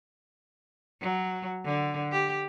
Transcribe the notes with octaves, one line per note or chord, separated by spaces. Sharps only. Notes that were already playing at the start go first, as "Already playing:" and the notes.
F#3
D3
G4